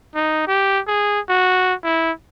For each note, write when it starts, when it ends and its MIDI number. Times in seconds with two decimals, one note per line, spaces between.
0.15 0.43 63
0.47 0.80 67
0.87 1.20 68
1.29 1.74 66
1.84 2.11 64